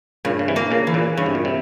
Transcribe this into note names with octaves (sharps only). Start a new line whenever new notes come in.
G2 A#2 C#3
C#3
C3 E3
A#3
A#2 C#3
E3
A#2 C#3
G2 C#3
C3
A#2
C3